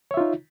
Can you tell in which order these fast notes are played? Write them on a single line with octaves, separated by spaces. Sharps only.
C#5 E5 F4 D#4